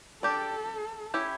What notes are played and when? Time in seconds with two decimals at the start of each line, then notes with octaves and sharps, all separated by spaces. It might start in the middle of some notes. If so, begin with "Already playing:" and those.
0.23 D4 G4 A4 D5
1.14 C#4 E4 G4 C#5